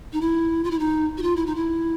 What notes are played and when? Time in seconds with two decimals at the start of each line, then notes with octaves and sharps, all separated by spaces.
0.13 D#4
0.21 E4
0.64 F4
0.71 E4
0.79 D#4
1.18 F#4
1.22 F4
1.36 E4
1.46 D#4
1.55 E4